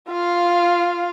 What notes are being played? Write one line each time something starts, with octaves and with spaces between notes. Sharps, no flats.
F4 F5